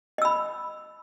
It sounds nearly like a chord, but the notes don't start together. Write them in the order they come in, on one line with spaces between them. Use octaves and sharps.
D#5 E6 B5